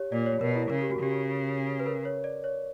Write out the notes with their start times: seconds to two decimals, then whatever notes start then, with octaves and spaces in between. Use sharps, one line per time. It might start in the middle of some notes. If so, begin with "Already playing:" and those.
Already playing: G4 C#5
0.12 A#2 D5
0.26 C#5
0.41 B2 A#4
0.55 E4
0.70 C#3 A#4
0.81 G4
0.91 F#4
1.00 C#3 G4
1.80 B4
1.86 A#4
2.05 C#5
2.24 D5
2.44 C#5